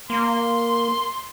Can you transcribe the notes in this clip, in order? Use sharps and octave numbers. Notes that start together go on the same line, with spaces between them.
A#3 C6